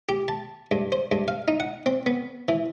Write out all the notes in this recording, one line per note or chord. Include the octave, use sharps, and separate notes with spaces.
G4
A5
G2
C5
G2
F5
D#4
F#5
C4
B3
E3